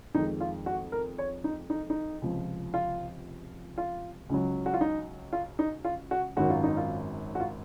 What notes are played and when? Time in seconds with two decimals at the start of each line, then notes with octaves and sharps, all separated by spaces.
0.15 F2 D#3 G#3 D#4
0.41 F4
0.66 F#4
0.92 A#4
1.18 C#5
1.44 D#4
1.70 D#4
1.90 D#4
2.22 C#2 C3 F3
2.74 F4
3.78 F4
4.29 C#2 C#3 F#3
4.66 F#4
4.74 F4
4.81 D#4
5.33 F4
5.59 D#4
5.84 F4
6.11 F#4
6.37 G#1 F#2 D#3 F#3 F#4
6.50 F4
6.64 D#4
6.77 F4
7.35 F#4
7.40 F4